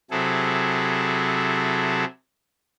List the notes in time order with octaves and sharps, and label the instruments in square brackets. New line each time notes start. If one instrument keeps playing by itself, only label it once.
[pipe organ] C3 F#3 E4 G#4 A4